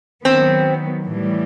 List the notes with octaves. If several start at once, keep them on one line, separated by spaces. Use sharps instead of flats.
D#3 F#3 B3 C4
A2 E3 G3